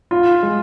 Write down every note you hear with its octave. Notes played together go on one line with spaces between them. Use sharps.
F4
G#3